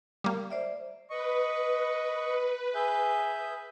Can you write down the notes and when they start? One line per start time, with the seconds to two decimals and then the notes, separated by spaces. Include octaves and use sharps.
0.24 G3 A#3
0.50 C5 D5 E5
1.10 B4 D#5 C#6
2.74 G#4 E5 G6